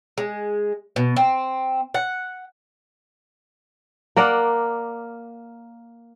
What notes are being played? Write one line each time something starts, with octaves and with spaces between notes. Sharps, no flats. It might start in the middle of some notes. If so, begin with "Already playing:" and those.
G#3
B2
C4
F#5
A#3 A#4 D5 F#5